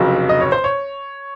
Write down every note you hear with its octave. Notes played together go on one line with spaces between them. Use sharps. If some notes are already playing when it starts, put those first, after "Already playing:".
Already playing: F1 F2 C#3 F#3
D#5
C#5
C5
C#5